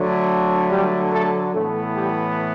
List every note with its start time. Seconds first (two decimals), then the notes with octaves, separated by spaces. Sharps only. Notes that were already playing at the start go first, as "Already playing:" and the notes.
Already playing: D3 F#3 A3
0.70 G3 G4
1.13 A3 A4
1.54 A2 E3 A3 B3 A4
1.96 G3 G4